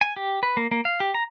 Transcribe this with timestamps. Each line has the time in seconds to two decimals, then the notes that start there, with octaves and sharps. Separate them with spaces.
0.01 G#5
0.16 G4
0.43 B4
0.57 A#3
0.71 A#3
0.85 F5
1.00 G4
1.14 A#5